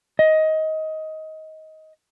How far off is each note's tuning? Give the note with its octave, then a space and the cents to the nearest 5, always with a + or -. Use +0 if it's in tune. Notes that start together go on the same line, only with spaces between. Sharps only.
D#5 +20